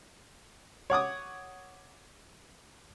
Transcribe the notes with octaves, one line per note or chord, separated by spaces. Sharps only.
C#5 F#5 D6 D#6